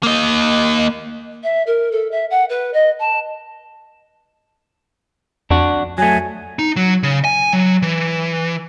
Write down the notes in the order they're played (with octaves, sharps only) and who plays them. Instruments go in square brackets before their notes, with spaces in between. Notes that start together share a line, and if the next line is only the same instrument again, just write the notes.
[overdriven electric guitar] A#3 D#5
[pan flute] E5
A#4
A4
E5
F#5
B4
D#5
A5
[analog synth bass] F2 [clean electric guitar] D4 F#4
[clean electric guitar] F#3 A3 [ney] G#5
[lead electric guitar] D#4
F#3
C#3
G#5
F#3
E3